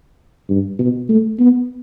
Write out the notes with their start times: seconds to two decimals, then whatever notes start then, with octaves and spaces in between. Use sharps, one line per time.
0.49 G2
0.79 B2
1.09 A3
1.39 B3